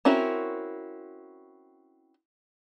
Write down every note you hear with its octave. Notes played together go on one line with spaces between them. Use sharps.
C4 C#4 E4 F#4 A#4